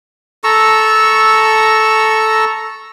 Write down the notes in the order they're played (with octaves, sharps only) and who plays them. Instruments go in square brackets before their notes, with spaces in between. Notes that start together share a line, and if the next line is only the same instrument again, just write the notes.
[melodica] A4 A#5 C#6 E6